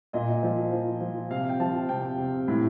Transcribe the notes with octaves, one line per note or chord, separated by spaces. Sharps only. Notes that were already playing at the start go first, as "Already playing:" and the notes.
A#2 D#5
F3
F3
F3
C3 F5
G5
F3 A5
C3 G5
C3
A2